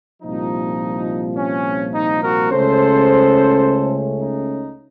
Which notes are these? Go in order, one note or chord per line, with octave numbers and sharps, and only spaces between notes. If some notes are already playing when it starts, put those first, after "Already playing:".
C2 A#2 F3 D#4
C#4
D#4
F#4 A#4
C#2 C#3 A3 C#4 A4 C5
D#4